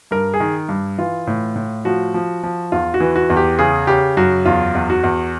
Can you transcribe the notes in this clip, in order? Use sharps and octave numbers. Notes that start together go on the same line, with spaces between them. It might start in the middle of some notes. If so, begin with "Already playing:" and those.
G2 A#4
G#4
D#3
G2
E3 F4
A2
A2
F3 F#4
F3
F3
E2 F4
F#4
E3
F#4
E2
G4
C#3 G#4
C#3 G4
F#2 F#4
E2 F4
E2
F#4
E2